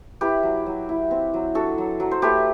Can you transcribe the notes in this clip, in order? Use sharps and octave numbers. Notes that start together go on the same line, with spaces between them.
E4 G4 B4
F#3
F#3
E4
C4
F#3
D4 F#4 A4
F#3
F#3
C5
A3 G4 B4